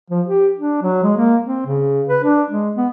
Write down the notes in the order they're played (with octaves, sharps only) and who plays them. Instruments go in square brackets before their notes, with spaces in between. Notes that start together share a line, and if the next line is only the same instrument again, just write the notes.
[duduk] F3
G4
D4
F#3
G#3
A#3
C4
C#3
B4
D4
G#3
B3